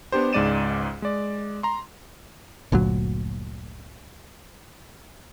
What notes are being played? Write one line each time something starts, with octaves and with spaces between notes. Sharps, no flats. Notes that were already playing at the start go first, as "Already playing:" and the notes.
B3 D4 G4 C5
C#2 G#2 G#3 D5 D#7 E7
G#3 D5
A#5 C6
G1 D2 A#2 F#3